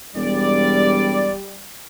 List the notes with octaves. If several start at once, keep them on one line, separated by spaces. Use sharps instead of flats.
E1 G3 D5